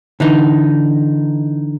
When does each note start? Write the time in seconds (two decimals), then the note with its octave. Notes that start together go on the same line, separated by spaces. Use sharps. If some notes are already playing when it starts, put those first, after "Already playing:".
0.20 D3 E3 D#4